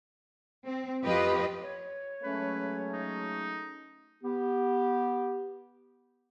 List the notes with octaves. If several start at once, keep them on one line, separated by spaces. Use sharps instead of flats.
C4
F2 F4 G4 B4 D#5
C#5
F#3 G#3 A3 C#4 B4
D#4
B3 G4